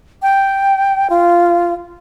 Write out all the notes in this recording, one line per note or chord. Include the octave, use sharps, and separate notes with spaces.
G5
F4